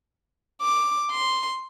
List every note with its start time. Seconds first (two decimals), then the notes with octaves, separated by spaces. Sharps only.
0.61 D6
1.11 C6